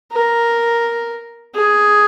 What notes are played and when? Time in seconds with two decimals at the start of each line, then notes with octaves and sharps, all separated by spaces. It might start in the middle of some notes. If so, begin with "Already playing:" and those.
0.12 A#4
1.55 G#4